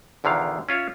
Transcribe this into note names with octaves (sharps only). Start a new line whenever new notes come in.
A#1 E2 D3 D#3 F5
C#4 F4 C#5 E5